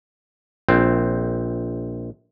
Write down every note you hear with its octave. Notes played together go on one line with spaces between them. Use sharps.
A#1 C4